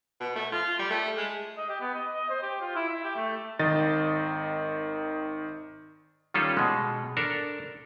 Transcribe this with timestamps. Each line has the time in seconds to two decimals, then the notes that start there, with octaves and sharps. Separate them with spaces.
0.20 B2
0.36 A3
0.52 F4
0.79 G3
0.90 A3
1.17 G#3
1.57 D#5
1.69 G4
1.80 B3
1.95 D#5
2.13 D#5
2.30 C5
2.43 G4
2.61 F4
2.76 E4
2.89 E5
3.04 G4
3.16 A3
3.59 G#1 D#3 D#5 A6
6.34 D#3 G3 C#4 F4 A4
6.57 B2 G#3
7.17 D4 A4 A#4